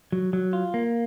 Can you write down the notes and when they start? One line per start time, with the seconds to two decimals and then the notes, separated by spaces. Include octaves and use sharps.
0.12 F#3
0.33 F#3
0.53 F4
0.74 A#3